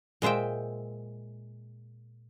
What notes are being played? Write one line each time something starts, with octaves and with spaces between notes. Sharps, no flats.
A#2 G#3 C5 E5 G5